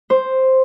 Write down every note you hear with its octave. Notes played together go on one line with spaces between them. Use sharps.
C5